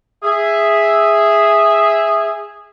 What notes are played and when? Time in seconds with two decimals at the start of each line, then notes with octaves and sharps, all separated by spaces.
0.23 G#4 E5